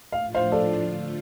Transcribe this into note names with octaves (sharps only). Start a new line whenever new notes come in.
F5
A2 F3 D4 F4
C5 F5
A4 D5
D3 A3 F4